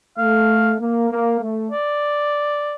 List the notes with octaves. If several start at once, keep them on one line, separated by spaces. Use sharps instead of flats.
A3 F5
A#3
A#3
A3
D5